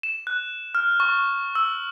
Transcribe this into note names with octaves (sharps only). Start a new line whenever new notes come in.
E7
F#6
F6
C#6
E6